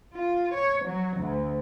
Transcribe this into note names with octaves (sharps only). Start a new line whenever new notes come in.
F4
C#5
F#3
D2